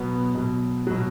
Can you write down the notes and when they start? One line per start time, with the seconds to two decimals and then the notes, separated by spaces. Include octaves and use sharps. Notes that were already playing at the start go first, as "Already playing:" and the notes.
Already playing: B2 F#3 B3
0.35 B2 F#3
0.87 B2 F#3